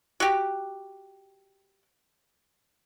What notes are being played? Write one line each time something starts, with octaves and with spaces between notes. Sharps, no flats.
F#4 G4